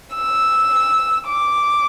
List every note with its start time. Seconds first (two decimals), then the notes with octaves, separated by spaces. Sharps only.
0.14 E6
1.27 D6